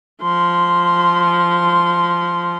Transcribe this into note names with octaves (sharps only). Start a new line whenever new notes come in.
F3 C6